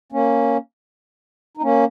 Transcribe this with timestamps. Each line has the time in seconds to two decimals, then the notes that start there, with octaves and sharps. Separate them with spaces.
0.12 A#3 C#4
1.57 D#4
1.62 A#3 C#4